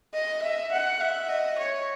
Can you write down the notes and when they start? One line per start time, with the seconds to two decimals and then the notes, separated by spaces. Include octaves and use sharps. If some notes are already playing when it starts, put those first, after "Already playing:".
0.13 D#5
0.42 E5
0.72 F#5
1.01 E5
1.29 D#5
1.58 C#5